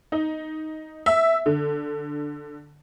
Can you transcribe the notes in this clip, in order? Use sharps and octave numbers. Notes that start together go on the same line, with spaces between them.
D#4
E5
D3